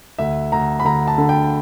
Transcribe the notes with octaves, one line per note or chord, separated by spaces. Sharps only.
D2 E5
D2 A#5
B5
D2 A#5
A5
D3
G5